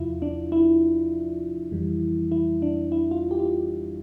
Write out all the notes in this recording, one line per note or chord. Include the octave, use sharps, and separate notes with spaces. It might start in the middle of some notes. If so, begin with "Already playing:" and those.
Already playing: E2 C3 F3 E4 F4
D4
E4
F2 E3 G3
E4
D4
E4
F4
G4
F4
G4